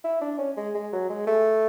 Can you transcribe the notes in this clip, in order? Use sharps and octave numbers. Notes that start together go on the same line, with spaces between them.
E4
D4
C#4
G#3
G#3
F#3
G#3
A3